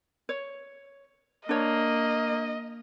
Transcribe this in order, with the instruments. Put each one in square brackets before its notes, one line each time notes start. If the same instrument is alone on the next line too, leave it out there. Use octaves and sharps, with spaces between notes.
[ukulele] C#5
[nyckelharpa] A#3 [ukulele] D4 C#5 [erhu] D#5